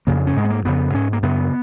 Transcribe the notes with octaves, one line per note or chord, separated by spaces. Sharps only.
F2 C#3 A#3
C#4
G#2 G#3
B3
A#3
F2 C#3 B3
G#2 C#4
A#3
F#2 C#3 B3